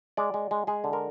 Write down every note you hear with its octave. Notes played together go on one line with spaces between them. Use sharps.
G#3 D5
G#3
G#3
G#3 G#4
D3
A#4